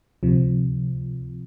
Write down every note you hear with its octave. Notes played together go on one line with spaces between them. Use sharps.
D2 C3 F3